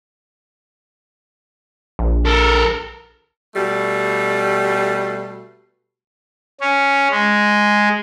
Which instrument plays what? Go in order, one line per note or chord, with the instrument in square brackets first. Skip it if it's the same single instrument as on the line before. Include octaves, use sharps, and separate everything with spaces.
[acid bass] A#1
[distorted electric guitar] A4 A#4
[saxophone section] B2 G3 A3
[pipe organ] C#4
G#3